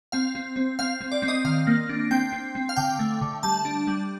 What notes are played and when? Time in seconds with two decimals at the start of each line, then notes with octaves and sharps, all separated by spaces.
0.12 C4 F5
0.35 C4
0.56 C4
0.79 C4 F5
1.01 C4
1.12 D5
1.22 C4
1.28 D#5
1.45 D#3 F5
1.67 A#3
1.89 D4
2.11 C4 G5
2.32 C4
2.55 C4
2.69 F5
2.76 D3 G5
2.99 A3
3.21 D3
3.43 G3 A5
3.65 D4
3.87 G3